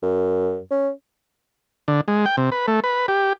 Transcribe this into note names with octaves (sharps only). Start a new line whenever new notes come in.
F#2
C#4
D3
G#3
G5
C3
B4
A3
B4
G4